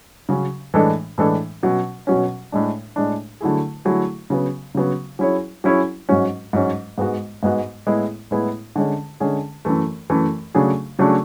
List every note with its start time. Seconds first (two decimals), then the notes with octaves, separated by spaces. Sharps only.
0.29 C#3 F#3 C#4
0.74 A2 E3 G#3 D4 A4
1.18 A2 E3 G#3 D4 A4
1.63 B2 F#3 C#4
2.07 B2 F#3 C#4
2.52 A2 G#3 D4
2.96 A2 G#3 D4
3.41 D3 F#3 A3 E4 G#4
3.85 D3 F#3 A3 E4 G#4
4.30 C#3 F#3 B3
4.75 C#3 F#3 B3
5.19 F#3 C#4 E4 G#4 C#5
5.64 F#3 C#4 E4 G#4 C#5
6.09 G#2 F#3 C#4
6.53 G#2 F#3 C#4
6.98 G#2 G#3 B3 F#4
7.43 G#2 G#3 B3 F#4
7.87 A2 G#3 B3 E4 G#4
8.31 A2 G#3 B3 E4 G#4
8.76 D3 G#3 C#4 G#4
9.20 D3 G#3 C#4 G#4
9.65 F#2 E3 A3
10.10 F#2 E3 A3
10.54 C#3 F#3 A3 D4 G#4
10.99 C#3 F#3 A3 D4 G#4